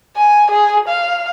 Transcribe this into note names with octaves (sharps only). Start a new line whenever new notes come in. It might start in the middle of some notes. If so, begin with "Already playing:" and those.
G#5
G#4
F5